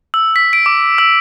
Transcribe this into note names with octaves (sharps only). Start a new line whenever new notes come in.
E6
B6
D7
D6
E6